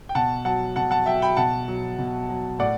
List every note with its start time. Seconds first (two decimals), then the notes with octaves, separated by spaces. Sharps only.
0.09 G5
0.15 B2 F#5 A5
0.45 F#3 F#5 A5
0.76 B2 F#5 A5
0.91 F#5 A5
1.06 F#3 E5 G5
1.22 G5 B5
1.37 B2 F#5 A5
1.68 F#3
1.98 B2
2.29 F#3
2.59 A2 D5 F#5